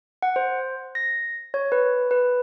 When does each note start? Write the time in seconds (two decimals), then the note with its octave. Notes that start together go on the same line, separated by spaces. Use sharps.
0.22 F#5
0.36 C5
0.95 A#6
1.54 C#5
1.72 B4
2.11 B4